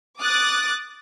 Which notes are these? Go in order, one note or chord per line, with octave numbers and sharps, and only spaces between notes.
D6 D#6 F#6 A6